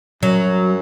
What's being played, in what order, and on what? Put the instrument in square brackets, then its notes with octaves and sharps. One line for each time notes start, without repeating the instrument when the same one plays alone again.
[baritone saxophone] F#2 [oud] F#3